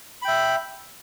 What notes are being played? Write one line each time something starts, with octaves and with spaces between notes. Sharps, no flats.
E5 G5 B5